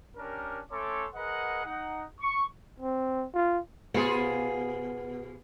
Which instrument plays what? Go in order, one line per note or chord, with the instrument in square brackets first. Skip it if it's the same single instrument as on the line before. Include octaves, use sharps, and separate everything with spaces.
[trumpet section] C#4 D4 G4 A#4
A3 C#4 A4 C#5 C6 D6
G#4 A#4 B4 D#5 F#5
D#4 F#5
C#6
[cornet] C4
F4
[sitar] B2 F4 G#4 [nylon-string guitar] B3